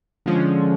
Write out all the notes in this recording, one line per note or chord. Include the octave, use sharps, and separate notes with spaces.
D3 F3 G#3 C#4